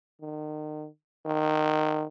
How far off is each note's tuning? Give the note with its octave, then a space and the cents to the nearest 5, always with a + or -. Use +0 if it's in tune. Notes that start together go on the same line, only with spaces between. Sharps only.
D#3 -35
D#3 -15